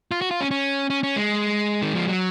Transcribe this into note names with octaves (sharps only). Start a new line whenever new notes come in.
F4
F#4
F4
C#4
C#4
C#4
C#4
G#3
D#3
F3
F#3